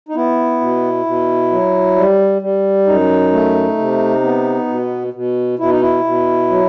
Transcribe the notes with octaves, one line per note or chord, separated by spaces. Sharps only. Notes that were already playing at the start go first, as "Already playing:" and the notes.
D#4
B3 E4
B2
B2
F#3
G3
G3
F#2 D#4
A3
C3
B3
B2
B2
B2 E4
D#4
E4
B2
F#3